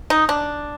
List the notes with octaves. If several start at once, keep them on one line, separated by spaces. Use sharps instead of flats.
D#4
D4